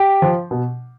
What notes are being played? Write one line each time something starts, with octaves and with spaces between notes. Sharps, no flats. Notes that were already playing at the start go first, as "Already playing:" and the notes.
Already playing: G4
F3
B2